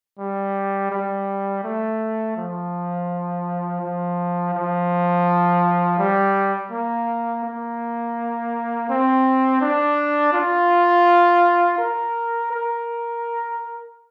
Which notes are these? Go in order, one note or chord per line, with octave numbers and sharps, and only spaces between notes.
G3
G3
A3
F3
F3
F3
G3
A#3
A#3
C4
D4
F4
A#4
A#4